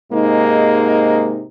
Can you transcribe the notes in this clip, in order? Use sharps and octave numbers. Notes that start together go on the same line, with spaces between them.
G#2 C3 G#3 A#3 D#4